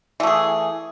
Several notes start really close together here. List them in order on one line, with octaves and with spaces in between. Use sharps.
E3 A3 G#4